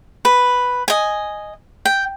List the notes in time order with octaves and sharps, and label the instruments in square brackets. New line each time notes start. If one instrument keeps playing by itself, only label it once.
[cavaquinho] B4
D#5 G#5
G5